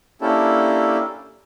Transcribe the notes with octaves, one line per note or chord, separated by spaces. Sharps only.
A#3 C#4 D4 E4 G4 A4